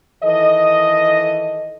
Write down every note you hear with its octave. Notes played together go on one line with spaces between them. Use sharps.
D#3 E3 A4 D#5